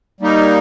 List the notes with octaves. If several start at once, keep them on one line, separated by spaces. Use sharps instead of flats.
G3 A#3 D#4